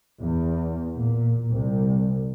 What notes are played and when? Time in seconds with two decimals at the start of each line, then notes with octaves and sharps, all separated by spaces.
0.20 E2
0.96 A#2
1.51 C2